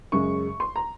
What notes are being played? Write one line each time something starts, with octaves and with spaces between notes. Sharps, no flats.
F#2 C#3 G#3 C#6
C6
A#5